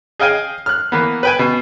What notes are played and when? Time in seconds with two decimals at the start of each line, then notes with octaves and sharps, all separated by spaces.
0.20 G#4 D#5 F5 G5 G#5
0.66 F6 F#6
0.92 E3 A#3 B3
1.23 B4 G5 G#5
1.39 B2